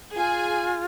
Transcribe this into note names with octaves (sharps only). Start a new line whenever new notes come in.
F4 G#4 G#5